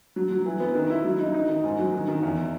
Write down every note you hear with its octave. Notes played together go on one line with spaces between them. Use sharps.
F#3
F#3
E3
B3
D#3
E4
F#3
D#4
D#4
D#3
G#2
F#3
D#3
D#3
E2